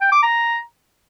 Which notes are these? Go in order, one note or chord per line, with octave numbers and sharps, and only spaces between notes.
G5
D6
A#5